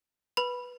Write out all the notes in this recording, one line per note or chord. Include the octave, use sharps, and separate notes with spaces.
B4 B5